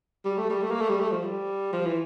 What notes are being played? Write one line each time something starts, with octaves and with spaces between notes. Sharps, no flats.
G3
A3
G3
A3
A#3
A3
G3
A3
F3
G3
F3
E3